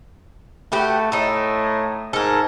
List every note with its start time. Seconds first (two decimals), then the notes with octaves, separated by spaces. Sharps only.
0.72 A3 F#4 G4 B4
1.12 A2 A3 D#4
2.13 G#2 A4 A#4